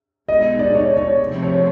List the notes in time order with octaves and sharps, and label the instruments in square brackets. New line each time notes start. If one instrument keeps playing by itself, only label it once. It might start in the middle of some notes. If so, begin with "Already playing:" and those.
[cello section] B2 G#3 B3 D#4 [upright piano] D#5
[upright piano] D5
C#5
C#5
[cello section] C3 F3 A3 C4
[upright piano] C#5